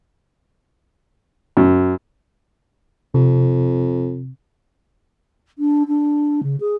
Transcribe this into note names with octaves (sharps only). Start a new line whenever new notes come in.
F#2
F2 C3
D4
D4
C#3
G#4